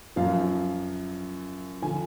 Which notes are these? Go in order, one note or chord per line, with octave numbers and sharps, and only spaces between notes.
F#2 F3 F5
D3 F3 G#5